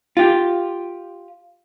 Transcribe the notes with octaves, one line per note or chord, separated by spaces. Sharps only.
F4 G4